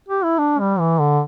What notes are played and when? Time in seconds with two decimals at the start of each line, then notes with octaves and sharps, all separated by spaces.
0.09 G4
0.24 E4
0.39 D4
0.60 G3
0.79 E3
1.00 D3